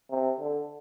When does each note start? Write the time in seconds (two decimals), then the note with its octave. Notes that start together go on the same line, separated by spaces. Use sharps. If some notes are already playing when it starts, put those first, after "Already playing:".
0.11 C3
0.40 D3